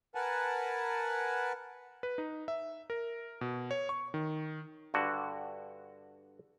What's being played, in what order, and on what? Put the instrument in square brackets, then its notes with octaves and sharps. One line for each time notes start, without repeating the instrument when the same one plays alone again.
[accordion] A#4 B4 F#5 G#5 A5
[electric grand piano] B4
D#4
E5
A#4
B2
C#5
C#6
D#3
[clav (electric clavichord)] G2 D3 F#4